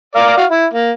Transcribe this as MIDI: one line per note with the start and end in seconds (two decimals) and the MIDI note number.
0.15 0.36 70
0.15 0.36 74
0.15 0.36 77
0.37 0.45 66
0.37 0.45 77
0.50 0.66 64
0.74 0.91 58